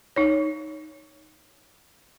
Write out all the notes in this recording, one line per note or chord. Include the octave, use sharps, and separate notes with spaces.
D#4 C#5